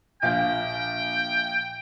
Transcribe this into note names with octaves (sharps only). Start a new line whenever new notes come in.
A#1 F4 G5